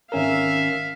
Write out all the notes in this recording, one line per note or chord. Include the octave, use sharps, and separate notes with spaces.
G#1 C#4 A#4 E5 F5